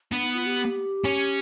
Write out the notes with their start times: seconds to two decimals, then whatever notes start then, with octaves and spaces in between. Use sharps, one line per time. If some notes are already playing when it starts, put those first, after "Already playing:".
0.12 B3 D4
0.23 D#4
0.35 F4
0.46 G4
1.04 C#4